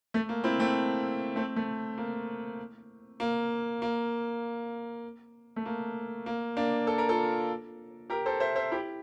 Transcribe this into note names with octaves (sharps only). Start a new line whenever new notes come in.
A3
A#3
C4 E4
A3 C4
A3 C4
A3
A#3
A#3
A#3
A3
A#3
A#3
A#3 D4
A4
A#4
F4 A4
G4 A#4
A4 C5
C5 E5
C5 E5
E4 G4